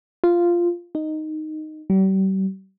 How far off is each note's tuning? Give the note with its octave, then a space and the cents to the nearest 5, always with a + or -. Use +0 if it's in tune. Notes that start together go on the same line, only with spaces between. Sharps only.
F4 -10
D#4 -5
G3 -40